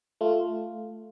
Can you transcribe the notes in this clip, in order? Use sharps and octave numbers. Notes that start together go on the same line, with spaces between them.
A3 F4